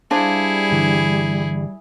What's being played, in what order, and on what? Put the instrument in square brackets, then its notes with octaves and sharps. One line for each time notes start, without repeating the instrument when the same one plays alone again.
[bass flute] G3 [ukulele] D4 C5 F5 [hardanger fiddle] E4 G#4
[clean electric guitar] G2 D3 E3